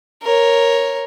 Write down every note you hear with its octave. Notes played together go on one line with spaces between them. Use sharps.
A#4 C#5